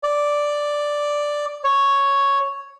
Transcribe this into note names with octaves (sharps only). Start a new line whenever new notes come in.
D5
C#5